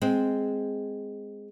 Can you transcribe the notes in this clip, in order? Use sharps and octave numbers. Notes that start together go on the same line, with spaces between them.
G#3 C4